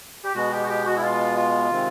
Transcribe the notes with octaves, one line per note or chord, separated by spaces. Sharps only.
G4
B2 G#3 B3 F#4
G4
F#4
G4
F#4
E4
F4
F4
C3 D#3 G#3 C4